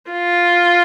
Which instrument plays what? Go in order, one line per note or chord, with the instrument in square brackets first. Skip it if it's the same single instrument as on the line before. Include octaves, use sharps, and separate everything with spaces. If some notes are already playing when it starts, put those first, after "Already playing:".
[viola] F4